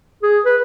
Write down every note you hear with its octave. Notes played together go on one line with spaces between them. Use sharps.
G#4
B4